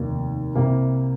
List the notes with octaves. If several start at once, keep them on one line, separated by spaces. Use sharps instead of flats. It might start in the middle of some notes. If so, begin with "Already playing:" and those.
Already playing: F1 D#2 D#3 A#3
C2 C3 G3 A#3